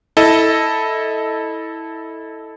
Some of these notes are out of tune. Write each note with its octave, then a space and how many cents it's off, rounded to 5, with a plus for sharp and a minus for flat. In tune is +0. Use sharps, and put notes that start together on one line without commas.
E4 -15 A4 +0 D#5 +0